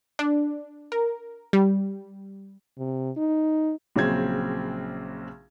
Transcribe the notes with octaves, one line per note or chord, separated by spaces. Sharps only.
D4
A#4
G3
C3
D#4
A#1 C#3 F#3 C4 G#6